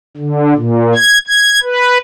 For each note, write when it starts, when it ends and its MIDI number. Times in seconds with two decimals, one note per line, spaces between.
0.17 0.53 50
0.56 0.94 46
0.95 1.18 92
1.27 1.60 92
1.63 1.98 71